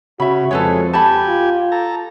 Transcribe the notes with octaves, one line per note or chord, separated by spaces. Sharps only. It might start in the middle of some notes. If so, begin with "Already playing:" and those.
C#3 F#4 E5 B5
F2 G#3 A4 B4 C#5
G4 G#5 A5 B5
F4
A4 A#5